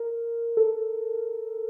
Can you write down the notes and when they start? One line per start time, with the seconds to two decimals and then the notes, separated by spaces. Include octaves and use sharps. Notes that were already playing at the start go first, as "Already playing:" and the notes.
Already playing: A#4
0.57 A4